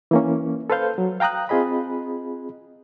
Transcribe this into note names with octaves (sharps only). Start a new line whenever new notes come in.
E3 A#3 C#4
A4 B4 C5 F5 G6
F#3
F5 G5 A#5 D#6 F#6
C4 F4 G#4 D#5 B5